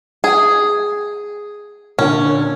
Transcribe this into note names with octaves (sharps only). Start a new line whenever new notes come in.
G#4
A#2 D3 C#4